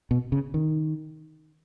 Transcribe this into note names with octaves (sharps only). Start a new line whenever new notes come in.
B2
C#3
D#3